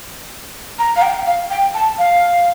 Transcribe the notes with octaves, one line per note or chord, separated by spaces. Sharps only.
A#5
F5
G5
F5
G5
A5
F5